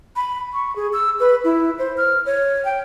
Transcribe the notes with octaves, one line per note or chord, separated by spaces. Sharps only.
B5
C#6
G#4
E6
B4
E4
C5
F6
C#5
G5